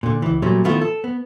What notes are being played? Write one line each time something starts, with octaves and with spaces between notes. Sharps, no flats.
A#2 D3
C#2 E3
A#2 F#3 G3 A3 C#4
D#3 F3 A3 B3 E4 F4
A4
B3